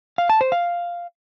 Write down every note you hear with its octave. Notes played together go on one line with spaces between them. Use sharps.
F5
A5
C5
F5